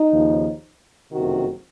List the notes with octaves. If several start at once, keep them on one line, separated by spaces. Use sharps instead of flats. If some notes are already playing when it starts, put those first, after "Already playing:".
Already playing: D#4
D#2 C#3 F3
F#1 F2 C3 D#3 F#4